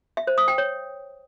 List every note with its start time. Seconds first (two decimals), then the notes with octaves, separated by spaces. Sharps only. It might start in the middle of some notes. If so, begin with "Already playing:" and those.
0.17 E5
0.27 C5
0.38 D#6
0.48 G5
0.58 C#5